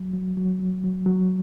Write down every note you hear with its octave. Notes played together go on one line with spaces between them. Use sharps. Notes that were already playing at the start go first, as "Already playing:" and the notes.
Already playing: F#3
F#3
F#3
F#3
F#3
F#3